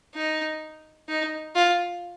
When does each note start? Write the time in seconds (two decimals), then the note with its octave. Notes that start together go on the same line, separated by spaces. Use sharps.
0.15 D#4
1.08 D#4
1.56 F4